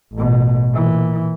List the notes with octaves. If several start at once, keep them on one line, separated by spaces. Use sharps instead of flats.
A1 B2
A#2 E3